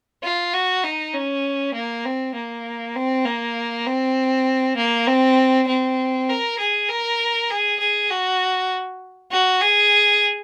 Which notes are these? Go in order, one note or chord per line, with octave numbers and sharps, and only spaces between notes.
F4
F#4
D#4
C#4
A#3
C4
A#3
C4
A#3
C4
A#3
C4
C4
A#4
G#4
A#4
G#4
G#4
F#4
F#4
G#4